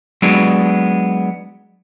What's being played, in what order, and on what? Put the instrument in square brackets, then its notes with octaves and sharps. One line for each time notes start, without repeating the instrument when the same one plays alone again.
[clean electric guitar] F#3 G#3 B3 D4